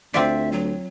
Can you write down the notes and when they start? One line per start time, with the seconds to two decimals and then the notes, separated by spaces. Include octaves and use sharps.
0.14 D2 C4 F4 D5 E5
0.52 F#3